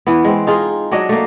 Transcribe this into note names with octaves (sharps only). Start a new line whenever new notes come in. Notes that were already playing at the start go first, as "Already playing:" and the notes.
E3 B3
G#3 C4
D#4 F4 G#4
F#3 D4 C#5 D#5
A3 A#3